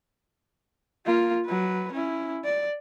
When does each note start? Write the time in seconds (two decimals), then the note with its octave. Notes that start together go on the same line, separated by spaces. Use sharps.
1.05 A#3 F4
1.46 F#3 B4
1.93 C#4 E4
2.45 D5